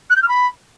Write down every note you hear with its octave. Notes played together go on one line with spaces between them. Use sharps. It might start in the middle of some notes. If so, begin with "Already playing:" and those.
F#6
G6
F6
B5